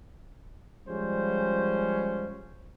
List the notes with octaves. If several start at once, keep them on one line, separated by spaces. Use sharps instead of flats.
F3 G3 G#3 C#4 C5